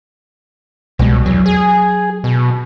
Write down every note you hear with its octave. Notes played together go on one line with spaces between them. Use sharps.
C2 B2 G3 G#3
E2 F#3
G#4
B2